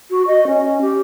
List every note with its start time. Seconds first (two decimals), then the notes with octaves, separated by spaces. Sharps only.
0.11 F#4
0.27 D#5
0.47 C#4
0.81 G4